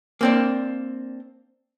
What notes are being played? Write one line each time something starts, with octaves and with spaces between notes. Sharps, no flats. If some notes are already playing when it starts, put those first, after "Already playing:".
A#3 C4 D4